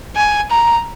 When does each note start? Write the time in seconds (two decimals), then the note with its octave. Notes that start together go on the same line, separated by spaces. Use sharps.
0.16 G#5
0.51 A#5